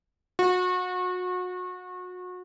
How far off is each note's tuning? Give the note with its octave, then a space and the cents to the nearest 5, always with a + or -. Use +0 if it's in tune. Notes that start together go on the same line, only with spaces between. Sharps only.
F#4 -30